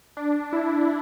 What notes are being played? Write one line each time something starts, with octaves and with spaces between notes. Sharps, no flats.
D4
E4